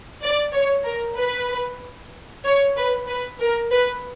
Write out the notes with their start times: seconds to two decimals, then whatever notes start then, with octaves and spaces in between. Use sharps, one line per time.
0.22 D5
0.54 C#5
0.85 A#4
1.17 B4
2.45 C#5
2.76 B4
3.08 B4
3.40 A#4
3.71 B4